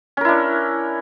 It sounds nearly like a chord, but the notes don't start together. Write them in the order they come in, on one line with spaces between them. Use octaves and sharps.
C#4 A#4 E4 D4